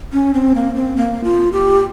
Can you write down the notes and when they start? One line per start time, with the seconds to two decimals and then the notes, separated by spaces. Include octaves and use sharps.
0.13 C#4
0.34 C4
0.55 A#3
0.75 C4
0.96 A#3
1.24 F4
1.53 G4